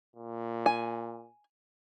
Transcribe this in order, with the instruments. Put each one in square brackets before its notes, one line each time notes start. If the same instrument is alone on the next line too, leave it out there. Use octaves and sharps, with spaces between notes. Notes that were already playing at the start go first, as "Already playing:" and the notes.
[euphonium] A#2
[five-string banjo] G#5